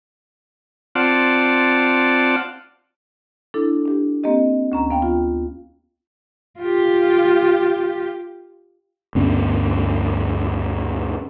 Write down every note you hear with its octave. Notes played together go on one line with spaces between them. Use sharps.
C4 F4 D5 F#5 A5
D4 E4 A4
D4 G4
A#3 C4 G4 D#5
D2 C#4 A#5
B3 F5 G5
F4
F4 G4
D2 G2 B3 C#4